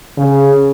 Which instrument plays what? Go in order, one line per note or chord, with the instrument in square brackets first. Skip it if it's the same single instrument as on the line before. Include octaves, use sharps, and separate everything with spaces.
[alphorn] C#3